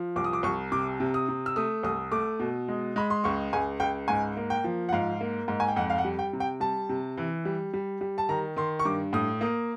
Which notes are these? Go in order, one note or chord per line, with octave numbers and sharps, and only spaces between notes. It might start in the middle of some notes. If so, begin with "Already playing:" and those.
Already playing: F3
C2 D6
D#6
D6
C2 C#6
C3 D6
C3
D#6
C3
E6
A3 D#6
C2 D#6
A3 D6
B2
G#3
G#3 B5
C6
C#2 C#6
C#2 G#5
C#2 G5
G#2 G#5
A#3
G5
F3
F#5
G#2 F5
A#3
G#2
G#5
G5
F2 F#5
F5
F#5
G3
G5
C3
G5
G3 A5
C3
E3
G3
G3
G3
A5
D#3 A#5
D#3 C6
C#6
G2 D6
A2 D#6
A#3 D#6